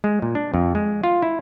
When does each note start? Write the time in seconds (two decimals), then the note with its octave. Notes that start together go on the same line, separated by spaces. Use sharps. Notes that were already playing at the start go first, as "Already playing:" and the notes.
0.04 G#3
0.22 A#2
0.35 D4
0.54 F2
0.75 G#3
1.04 F4
1.22 E4